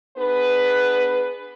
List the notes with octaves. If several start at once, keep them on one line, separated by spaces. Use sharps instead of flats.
B3 D4 G#4 B4